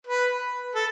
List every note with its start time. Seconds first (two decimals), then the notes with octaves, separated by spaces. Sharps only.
0.07 B4
0.75 A4